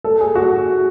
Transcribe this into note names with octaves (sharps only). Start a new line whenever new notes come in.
A4
G#4
F#4